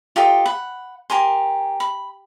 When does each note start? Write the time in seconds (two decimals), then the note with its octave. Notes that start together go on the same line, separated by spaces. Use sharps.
0.16 F4 G4 A4 D#5
0.46 F#5 B5
1.10 G4 A#4 G#5 C6
1.80 B5